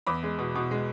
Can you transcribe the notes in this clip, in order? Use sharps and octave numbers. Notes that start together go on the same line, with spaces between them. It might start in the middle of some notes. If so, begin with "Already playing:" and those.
E2 B5 D6
G#3
B2
B2
G#3